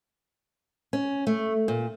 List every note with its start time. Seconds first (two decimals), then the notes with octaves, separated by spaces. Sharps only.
0.93 C#4
1.27 A3
1.68 A#2